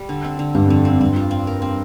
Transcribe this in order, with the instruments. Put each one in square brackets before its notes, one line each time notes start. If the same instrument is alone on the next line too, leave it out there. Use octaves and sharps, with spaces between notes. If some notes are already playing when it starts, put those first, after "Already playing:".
Already playing: [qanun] G3
D3
C4
D3
[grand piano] G2 [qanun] G3
[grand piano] F2 [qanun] D3
[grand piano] F2 [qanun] C4
[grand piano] G2 [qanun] C4
[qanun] F4
C4
A#4
C4